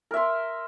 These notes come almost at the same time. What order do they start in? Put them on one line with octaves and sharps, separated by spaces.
A#4 E5 C6